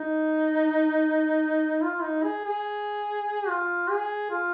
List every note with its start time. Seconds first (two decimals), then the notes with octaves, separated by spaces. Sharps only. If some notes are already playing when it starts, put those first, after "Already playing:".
Already playing: D#4
1.82 F4
2.02 D#4
2.23 G#4
2.45 G#4
3.48 F4
3.90 G#4
4.31 F4